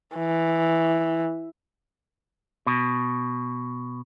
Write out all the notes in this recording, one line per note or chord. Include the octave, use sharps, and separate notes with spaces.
E3
B2